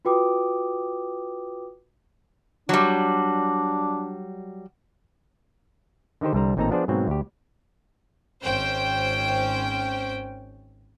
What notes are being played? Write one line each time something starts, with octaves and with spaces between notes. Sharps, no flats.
F4 F#4 B4 G5 D6 D#6
F#3 G3 D4
D3 D#3 D#4 G4 C5
C2 D3 G3 C5 A#5
A1 A#2 C4 D#4 A4 A#5
F3 B3 D4 G#4 C5 D5
G#2 B2 F#3 A#3 C4
D2 G4
G#1 C#4 C5 G5